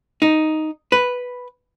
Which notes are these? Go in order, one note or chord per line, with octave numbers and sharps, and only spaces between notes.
D#4
B4